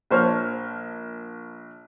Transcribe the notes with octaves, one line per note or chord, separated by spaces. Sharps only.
A#1 C5 C#5 A5 F6